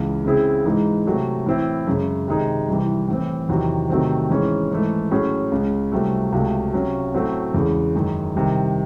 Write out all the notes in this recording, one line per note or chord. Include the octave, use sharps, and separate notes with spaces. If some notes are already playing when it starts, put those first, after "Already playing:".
Already playing: C#2 C#3 E3
C#3 G#3 C4 E4 G#4
G#2 E3 G#3 D#4
C3 F#3 A3
A2 E3 C4 E4
F#2 C#3 G#3
C3 D#3 G#3 D#4 G#4
C2 C3 E3
A2 E3 C4
E2 C3 D#3 F#3
C3 D#3 F#3 A3 C4
G#2 E3 G#3 C#4
G#2 E3 A3
A2 F#3 C#4 G#4
C#2 C#3 G#3
C2 C3 F#3 A3
C#2 C3 F#3 A3
C3 F#3 C#4
A2 F#3 A3 C4 F#4
E2 C#3 G#3
F#2 D#3 G#3
C2 C3 D#3